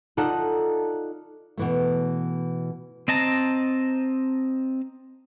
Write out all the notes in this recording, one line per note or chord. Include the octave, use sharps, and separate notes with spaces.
D#4 F4 A4 D5 F#5 A#5
B2 E3 A3
C4 D#5 A5 A#5